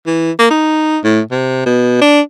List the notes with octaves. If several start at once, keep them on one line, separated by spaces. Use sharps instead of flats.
E3
A#3
D#4
A2
C3
B2
D4